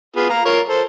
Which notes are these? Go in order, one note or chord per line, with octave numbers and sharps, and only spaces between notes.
B3 F4 G#4
F5 A#5
F4 A#4 C#5
A4 C5